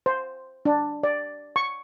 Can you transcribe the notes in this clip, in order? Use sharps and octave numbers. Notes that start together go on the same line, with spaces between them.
C5
D4
D5
C#6